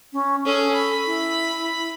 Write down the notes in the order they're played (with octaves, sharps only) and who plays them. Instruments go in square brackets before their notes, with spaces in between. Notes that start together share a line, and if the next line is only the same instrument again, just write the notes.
[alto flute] C#4
[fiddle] C#4 G#4 [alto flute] A4
[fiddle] B5
[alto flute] E4